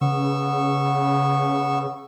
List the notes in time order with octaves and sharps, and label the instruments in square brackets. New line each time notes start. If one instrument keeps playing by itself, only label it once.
[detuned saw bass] C#3 [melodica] B3 C#6 E6